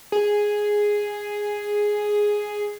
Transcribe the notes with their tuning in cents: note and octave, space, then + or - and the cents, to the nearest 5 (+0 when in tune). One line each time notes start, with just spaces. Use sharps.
G#4 +0